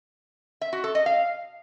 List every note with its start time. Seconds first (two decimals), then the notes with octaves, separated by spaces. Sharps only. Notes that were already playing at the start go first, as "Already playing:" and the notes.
0.61 E5
0.73 F#4
0.84 A4
0.95 D#5
1.06 F5